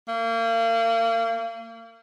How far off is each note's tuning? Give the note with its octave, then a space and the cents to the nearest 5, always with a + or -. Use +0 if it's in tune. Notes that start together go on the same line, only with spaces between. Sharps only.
A#3 -35